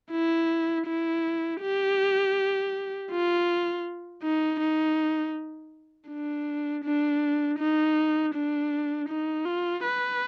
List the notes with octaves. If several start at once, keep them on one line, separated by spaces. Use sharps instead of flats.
E4
E4
G4
F4
D#4
D#4
D4
D4
D#4
D4
D#4
F4
B4